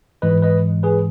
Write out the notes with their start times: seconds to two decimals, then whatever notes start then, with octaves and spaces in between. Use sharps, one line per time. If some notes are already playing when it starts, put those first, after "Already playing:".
0.22 G#2 E3 G#3 B4 D#5
0.42 B4 D#5
0.83 G#4 B4